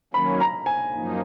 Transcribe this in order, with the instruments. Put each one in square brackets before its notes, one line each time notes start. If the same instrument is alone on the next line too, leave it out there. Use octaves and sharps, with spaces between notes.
[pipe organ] D#3 F#3 A#3 C#4 [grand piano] B5
[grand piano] A#5
G#5
[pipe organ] F#2 F3 A#3 D#4